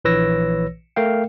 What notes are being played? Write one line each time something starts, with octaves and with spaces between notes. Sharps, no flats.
A#1 E3 B4 C#5 E6 A#6
A3 A#4 F5 G5